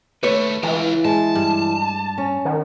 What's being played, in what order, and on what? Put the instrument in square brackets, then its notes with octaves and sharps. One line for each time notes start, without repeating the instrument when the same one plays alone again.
[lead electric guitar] D#2 A3 [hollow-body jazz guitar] B4 C#5
[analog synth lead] E3 [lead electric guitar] G#3 F4
[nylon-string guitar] G#3 [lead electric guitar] A5
[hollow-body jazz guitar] G2
[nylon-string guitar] C#4
[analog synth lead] D#3